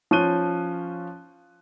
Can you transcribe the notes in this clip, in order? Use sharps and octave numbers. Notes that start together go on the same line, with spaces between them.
F3 C#4 C#6 F#6 D#7 G7